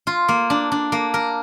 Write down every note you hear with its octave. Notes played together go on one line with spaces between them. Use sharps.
F4
A#3
D4
D4
A#3
A#4